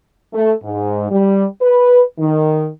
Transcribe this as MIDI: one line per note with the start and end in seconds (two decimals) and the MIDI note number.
0.33 0.53 57
0.64 1.10 44
1.10 1.45 55
1.62 2.02 71
2.19 2.68 51